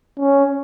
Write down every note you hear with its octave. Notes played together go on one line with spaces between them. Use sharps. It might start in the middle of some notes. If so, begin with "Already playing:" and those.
C#4